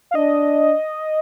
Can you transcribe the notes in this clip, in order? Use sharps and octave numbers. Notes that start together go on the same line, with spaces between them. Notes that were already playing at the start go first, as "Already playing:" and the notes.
F5
D4 D#5